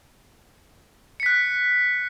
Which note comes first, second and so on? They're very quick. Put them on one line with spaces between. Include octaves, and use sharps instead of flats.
C#7 B6 F#6